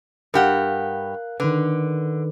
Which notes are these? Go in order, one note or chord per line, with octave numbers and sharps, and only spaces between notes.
G2 G4 A#4 F5 F#5 F#6
D3 D#3 B4